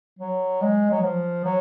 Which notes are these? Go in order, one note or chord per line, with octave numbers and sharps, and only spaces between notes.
F#3
G#3
F#3
F3
F#3